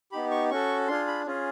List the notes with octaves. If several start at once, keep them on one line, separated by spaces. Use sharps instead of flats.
B3 D#4 G4 B5
C#6
C#4 F#4 A4 C#6
D4 F4 G#4 C6
B5
C#4 F4 G#4